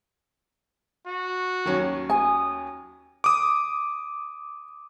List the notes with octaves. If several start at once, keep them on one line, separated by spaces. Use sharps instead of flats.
F#4
D#2 F#3 C#4
G#5 D#6
D6 D#6